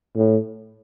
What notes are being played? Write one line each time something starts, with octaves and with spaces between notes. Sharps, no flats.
A2